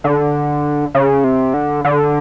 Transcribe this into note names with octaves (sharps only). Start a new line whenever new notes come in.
D3
C#3
C3
D3
D3